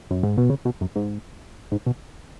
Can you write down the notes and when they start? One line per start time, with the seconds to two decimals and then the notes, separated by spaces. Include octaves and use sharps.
0.11 F#2
0.23 G#2
0.37 B2
0.50 C#3
0.65 B2
0.81 F#2
0.96 G#2
1.72 G#2
1.86 B2